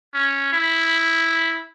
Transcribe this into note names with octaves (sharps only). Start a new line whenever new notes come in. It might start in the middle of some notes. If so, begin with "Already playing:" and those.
C#4
E4